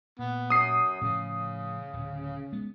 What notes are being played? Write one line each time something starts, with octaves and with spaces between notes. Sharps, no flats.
A#2 B3
F#2 D#6 C7
A2 C#3 F3
D1
G#3 B3